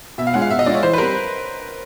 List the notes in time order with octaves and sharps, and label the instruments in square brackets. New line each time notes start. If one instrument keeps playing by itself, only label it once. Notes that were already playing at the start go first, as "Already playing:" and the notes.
[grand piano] B2 [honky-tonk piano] E5
[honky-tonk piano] F5
[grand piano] G#3 C#4 F4 [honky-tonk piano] F#5
[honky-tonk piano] F5
[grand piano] B2 [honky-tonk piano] E5
[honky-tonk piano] D#5
[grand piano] G#3 C#4 F4 [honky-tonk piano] D5
[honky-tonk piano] C#5
[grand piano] E3 [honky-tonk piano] C5
[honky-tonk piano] B4
[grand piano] G3 C4 [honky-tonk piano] A#4